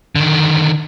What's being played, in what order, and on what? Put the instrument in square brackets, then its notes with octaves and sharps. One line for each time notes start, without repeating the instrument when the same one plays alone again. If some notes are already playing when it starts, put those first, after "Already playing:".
[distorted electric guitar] D3 D#3